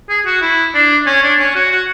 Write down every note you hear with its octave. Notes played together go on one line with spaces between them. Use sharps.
G#4
F#4
E4
D4
C#4
D4
C#4
F#4
F#4